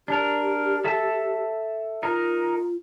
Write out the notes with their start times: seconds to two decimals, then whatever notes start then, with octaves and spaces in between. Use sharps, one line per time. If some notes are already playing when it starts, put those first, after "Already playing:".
0.08 D4 G4 A#4
0.84 A4 E5 A5
2.03 D#4 F4 A#4